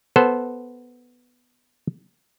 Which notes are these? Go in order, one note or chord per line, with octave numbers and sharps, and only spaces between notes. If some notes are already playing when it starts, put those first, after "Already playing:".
B3 A4 C5